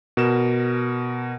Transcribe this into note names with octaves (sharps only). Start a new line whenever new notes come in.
B2 A#4 E7